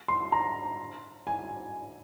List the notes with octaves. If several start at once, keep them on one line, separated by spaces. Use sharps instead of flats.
C6
A#5
G#5